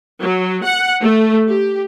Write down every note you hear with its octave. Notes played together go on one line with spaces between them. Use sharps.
F#3
F#5
A3
G4